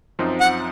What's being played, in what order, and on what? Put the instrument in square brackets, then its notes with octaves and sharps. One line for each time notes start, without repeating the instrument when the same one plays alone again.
[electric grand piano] F#2 F3 C4 D#4
[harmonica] F#5